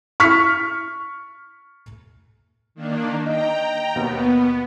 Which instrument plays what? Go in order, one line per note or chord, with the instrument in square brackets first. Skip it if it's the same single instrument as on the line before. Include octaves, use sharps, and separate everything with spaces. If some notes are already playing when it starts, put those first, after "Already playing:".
[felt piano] C#6 F6 B6
[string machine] D#3 A#3 D4
[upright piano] D#4 [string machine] G5 A#5
[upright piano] D#2 B2 [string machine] B3